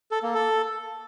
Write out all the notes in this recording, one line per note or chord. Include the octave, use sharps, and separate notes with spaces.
A4
A#3
A4